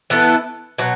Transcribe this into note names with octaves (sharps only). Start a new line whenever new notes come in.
E3 B3 E4 A4
B2 F#3